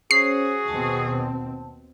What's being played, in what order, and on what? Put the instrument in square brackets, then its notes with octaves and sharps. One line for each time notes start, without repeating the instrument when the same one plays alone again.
[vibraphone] C#4 C5 C#5 [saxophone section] F#4 G#4 [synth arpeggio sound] C7
[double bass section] D#2 B2 C4 [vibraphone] A5